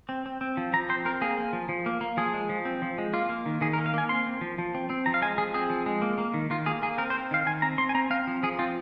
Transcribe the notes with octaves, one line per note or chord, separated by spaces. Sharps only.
C4
C4
C4
F3
F3 A#5
C4 C5
C4 A#4
A#3 G#4
A#3
F3
F3
A#3
A#3
F3 G#4
G#3
F3
C4
F3
G#3
A#3 F4
A#3
D#3
D#3 G#4
A#4
A#3
F5
A#3 G#5
C4 C6
C4
F3
F3
C4
C4
F3 A#5
F5
G#3 G#5
F3 G#4
C4 G#4
F3
G#3
A#3
A#3
D#3
D#3 F4
A#3 G#4
A#3 G#4
C4 A#4
C5
C4
D#3 F5
D#3 G#5
C4 A#5
C4 C6
G#5
C4 A#5
C4 F5
F3
F3 G#4
C4 F4